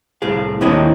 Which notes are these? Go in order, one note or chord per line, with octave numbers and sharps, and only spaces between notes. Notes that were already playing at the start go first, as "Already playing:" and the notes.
C2 A2 G#4 F5
D#2 A#3 C4 E4 C#5 D#5